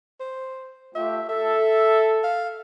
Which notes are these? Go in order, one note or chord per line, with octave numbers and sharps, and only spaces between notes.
C5
A3 F4 G4 E5
A4 E5
F5